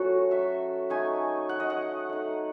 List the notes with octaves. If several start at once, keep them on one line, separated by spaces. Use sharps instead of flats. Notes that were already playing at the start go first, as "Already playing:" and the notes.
Already playing: F#3 A3 C#4 E4 F#4 A4
E5
A3 D#4 G#5
F#5
D#5
F#5
A3 D#4